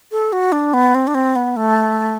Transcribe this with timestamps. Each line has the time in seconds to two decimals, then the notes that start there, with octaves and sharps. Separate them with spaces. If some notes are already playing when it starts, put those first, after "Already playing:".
0.12 A4
0.33 F#4
0.52 D4
0.74 B3
0.95 C4
1.07 D4
1.15 C4
1.36 B3
1.56 A3